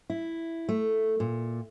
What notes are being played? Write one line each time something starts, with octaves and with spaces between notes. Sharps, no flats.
E4
A3
A#2